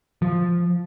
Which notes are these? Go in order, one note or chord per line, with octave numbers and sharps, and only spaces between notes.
F3